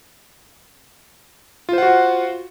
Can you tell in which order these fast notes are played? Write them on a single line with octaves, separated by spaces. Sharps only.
F4 C5 F#5 F#4